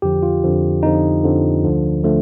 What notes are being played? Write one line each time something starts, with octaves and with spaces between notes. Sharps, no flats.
F2 D3 F3 G4
F4
F2 D3 F3
F2 D3 F3 D#4
F2 D3 F3
D2 D3 F3
D3 F3 A3